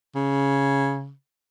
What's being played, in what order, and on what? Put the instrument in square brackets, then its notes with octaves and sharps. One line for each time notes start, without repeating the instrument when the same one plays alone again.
[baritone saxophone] C#3